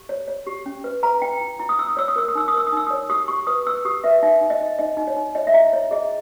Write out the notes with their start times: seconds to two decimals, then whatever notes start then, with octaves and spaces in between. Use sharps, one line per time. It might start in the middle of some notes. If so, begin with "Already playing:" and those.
Already playing: G4
0.09 C#5
0.28 C#5
0.47 G4
0.66 C#4
0.84 B4
1.03 B4 A#5
1.22 E4 G5
1.41 E4
1.59 E4
1.69 D#6
1.79 E4 E6
1.88 D#6
1.97 C#5 E6
2.08 D#6
2.16 A#4 E6
2.28 D#6
2.35 D#4 E6
2.48 D#6
2.54 A#4 E6
2.67 D#6
2.72 D#4 E6
2.87 D#6
2.90 C#5
3.10 G4 D#6
3.28 G4 C#6
3.47 B4 D#6
3.66 B4 E6
3.85 G4 D#6
4.04 B4 E5
4.22 D#4 E5
4.41 D#4
4.50 D#5
4.60 D#4
4.79 D#4 D#5
4.97 D#4
5.07 C#5
5.17 D#4
5.35 C#5 D#5
5.47 E5
5.54 E4 D#5
5.72 E4 C#5
5.91 G#4 D#5